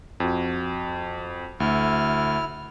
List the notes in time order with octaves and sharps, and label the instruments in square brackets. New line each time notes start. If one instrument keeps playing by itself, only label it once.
[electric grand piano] F2 F#4
[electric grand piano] D2 [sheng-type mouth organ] E4 F6